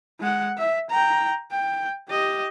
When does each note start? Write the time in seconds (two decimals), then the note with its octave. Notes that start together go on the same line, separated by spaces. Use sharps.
0.20 G#3 F#5
0.58 E5
0.90 G5 A#5
1.52 G5
2.09 G4 D#5